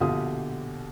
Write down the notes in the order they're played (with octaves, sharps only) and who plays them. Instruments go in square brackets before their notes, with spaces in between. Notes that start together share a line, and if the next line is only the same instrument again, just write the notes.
[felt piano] A#1 B2 D3 G4 F5 D#6